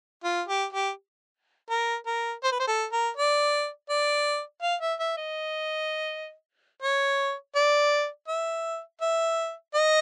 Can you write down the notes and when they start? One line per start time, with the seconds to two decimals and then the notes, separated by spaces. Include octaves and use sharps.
0.24 F4
0.48 G4
0.73 G4
1.70 A#4
2.06 A#4
2.43 C5
2.52 B4
2.60 C5
2.67 A4
2.92 A#4
3.17 D5
3.90 D5
4.62 F5
4.81 E5
4.99 E5
5.17 D#5
6.82 C#5
7.56 D5
8.28 E5
9.01 E5
9.75 D#5